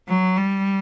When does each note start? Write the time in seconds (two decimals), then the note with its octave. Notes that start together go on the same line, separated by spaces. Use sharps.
0.08 F#3
0.37 G3